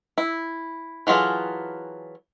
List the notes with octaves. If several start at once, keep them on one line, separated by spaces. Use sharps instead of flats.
E4
E3 F#3 F4 G#4 A4